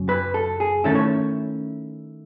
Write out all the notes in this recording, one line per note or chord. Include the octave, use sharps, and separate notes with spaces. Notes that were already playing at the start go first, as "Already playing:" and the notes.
Already playing: F#2 C#3 F#3
B4
A4
G#4
D#3 A3 C#4 E4 A4
C#5